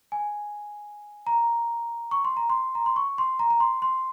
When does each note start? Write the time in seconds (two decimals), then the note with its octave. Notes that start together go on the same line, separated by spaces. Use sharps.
0.12 G#5
1.27 A#5
2.11 C#6
2.25 C6
2.37 A#5
2.50 C6
2.75 A#5
2.86 C6
2.96 C#6
3.18 C6
3.39 A#5
3.50 A#5
3.60 C6
3.82 C6